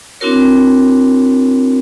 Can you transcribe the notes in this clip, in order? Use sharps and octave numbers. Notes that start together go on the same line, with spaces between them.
C4 D4 E4 F#4 A#4 C#5